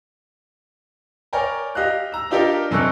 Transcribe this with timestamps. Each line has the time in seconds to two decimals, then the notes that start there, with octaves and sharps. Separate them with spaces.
1.33 A#4 C#5 D5 G5 G#5 A#5
1.75 G4 D#5 F5 F#6
2.12 A#5 E6
2.31 D4 D#4 F4 G4 A#4 D5
2.71 F#2 C3 D#4 A4 C#6 F#6